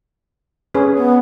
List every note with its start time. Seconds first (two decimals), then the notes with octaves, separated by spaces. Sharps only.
0.75 C#4 G#4 B4
0.97 B3